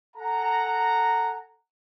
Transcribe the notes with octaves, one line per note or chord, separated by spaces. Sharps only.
A4 F#5 G#5 A#5